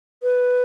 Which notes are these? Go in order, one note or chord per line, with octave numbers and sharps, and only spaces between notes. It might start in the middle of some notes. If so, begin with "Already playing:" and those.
B4